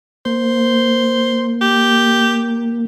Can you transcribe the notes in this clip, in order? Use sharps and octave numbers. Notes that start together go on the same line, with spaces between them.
A#3 C5
G4